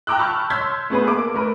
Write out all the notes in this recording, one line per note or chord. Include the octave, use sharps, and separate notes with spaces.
G5 A#5 D6 E6 F#6
A5 B5 C#6 E6 F6 G6
C#5 C6 E6 G6 G#6 B6
A3 B3 G#4 B4
A#3 D6
A3 A#4 B4